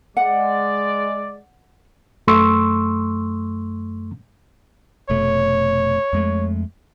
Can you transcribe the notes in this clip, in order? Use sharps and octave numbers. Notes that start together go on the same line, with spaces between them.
G#3 D5 F#5
F#2 A3 C6 C#6 E6
F1 B2 A3 C#5
F2 G#3 A3